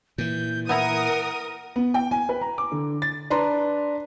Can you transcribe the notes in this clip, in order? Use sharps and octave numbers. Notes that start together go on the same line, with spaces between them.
A#2 E3 G6
B3 E4 A#4 F#5 A#5 D#6
B3
G5
G#5
B4
A#5
D6
D3
A6
D4 B4 A#5 C6